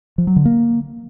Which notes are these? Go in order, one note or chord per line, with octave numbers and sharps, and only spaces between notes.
F3
F#3
D3
A#3